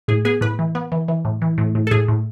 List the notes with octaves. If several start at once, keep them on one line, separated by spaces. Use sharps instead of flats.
A2 G#4
B3 G#4
A2 B4
E3
B3
E3
E3
A2
E3
A2
A2
A4
A2 G#4
A2